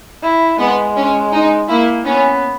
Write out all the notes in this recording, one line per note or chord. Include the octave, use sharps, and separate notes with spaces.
E4
G#3 B3
C#4
D#4
A#3 E4
B3 C#4